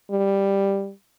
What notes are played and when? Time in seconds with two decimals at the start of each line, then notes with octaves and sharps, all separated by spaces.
0.11 G3